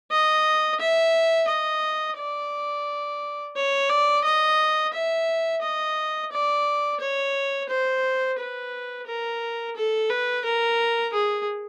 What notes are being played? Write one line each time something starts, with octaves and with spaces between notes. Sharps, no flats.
D#5
E5
D#5
D5
C#5
D5
D#5
E5
D#5
D5
C#5
C5
B4
A#4
A4
B4
A#4
G#4